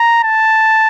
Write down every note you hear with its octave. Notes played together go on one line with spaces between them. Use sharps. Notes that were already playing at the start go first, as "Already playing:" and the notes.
Already playing: A#5
A5